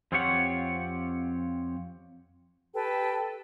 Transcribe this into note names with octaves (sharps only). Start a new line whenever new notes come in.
F2 C4 F4 G4 C#5 F#5
G4 A4 B4 G5